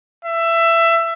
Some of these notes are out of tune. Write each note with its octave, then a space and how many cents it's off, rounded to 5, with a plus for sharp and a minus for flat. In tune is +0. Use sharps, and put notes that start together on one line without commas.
E5 +20